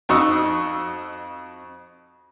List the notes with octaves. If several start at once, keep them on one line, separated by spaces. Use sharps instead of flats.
F2 D#4 F#4 C#6 D#6 E6